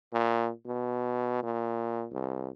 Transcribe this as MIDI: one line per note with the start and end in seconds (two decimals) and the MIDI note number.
0.13 0.50 46
0.66 1.43 47
1.43 2.07 46
2.12 2.49 36